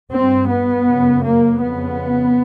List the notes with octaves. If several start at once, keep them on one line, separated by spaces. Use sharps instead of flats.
G2 C4
B3
F#2 C#3
A#3
F2 C#3 B3